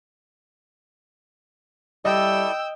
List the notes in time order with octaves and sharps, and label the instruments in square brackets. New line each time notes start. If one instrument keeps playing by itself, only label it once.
[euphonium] G3 [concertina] E4 A4 D5 [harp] D#5 [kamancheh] G5 E6